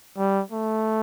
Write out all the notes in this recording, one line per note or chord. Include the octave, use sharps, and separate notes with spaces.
G3
A3